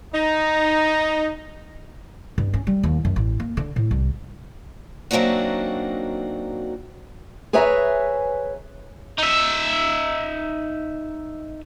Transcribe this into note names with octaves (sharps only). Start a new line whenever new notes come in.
D#4
G2
C#4
G3
D#2
F#2
A1
A#3
D3
A2
C2
F#3 A#3 C4 D4 D#4 F#4
G#4 B4 C#5 E5 G#5 A#5
D#4 E5